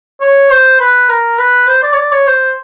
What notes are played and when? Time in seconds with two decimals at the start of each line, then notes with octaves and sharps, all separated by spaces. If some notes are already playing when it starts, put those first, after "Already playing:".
0.21 C#5
0.50 C5
0.80 B4
1.09 A#4
1.38 B4
1.68 C5
1.83 D5
1.93 C#5
1.97 D5
2.12 C#5
2.27 C5